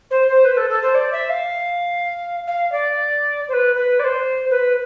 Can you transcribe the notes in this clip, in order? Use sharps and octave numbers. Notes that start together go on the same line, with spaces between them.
C5
C5
B4
A4
A4
C5
D5
E5
F5
F5
D5
C5
B4
B4
D5
C5
B4